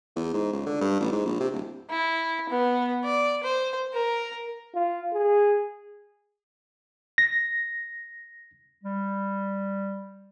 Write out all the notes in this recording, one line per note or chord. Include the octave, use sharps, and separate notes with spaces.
E2
G#2
C#2
D3
G2
A1
G#2
A#1
C3
D1
E4
B3
D5
C5
A#4
F4
G#4
A#6
G3